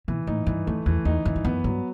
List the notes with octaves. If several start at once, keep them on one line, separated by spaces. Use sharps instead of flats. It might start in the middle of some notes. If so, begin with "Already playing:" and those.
B2 E3
A2 D#4
G2 E3
F#2 A3
E2 E3
E2 D#4
F#2 E3
G2
F#2 B3
G2 F#3